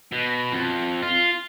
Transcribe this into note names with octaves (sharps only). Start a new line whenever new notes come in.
B2
F2
F4